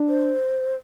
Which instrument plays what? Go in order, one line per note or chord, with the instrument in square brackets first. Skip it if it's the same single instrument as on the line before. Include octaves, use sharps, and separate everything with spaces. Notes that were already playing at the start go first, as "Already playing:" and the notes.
Already playing: [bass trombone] D4
[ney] C5